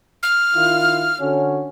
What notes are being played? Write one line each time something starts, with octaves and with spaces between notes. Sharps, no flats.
F6
D#3 E4 F4
D3 C#4 F#4